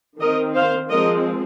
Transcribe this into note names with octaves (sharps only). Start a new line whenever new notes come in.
D#3 C4 A#4 D#5
C5 F5
F3 G#3 C4 A#4 D#5